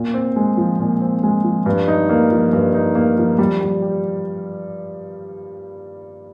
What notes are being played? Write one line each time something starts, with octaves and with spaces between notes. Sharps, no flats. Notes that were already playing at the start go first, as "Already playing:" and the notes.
Already playing: A#2
C4
G#3
F3
A#2
C4
G#3
F3
G2
D#4
A#3
F3
G2
D#4
A#3
F3
G3
G3
G4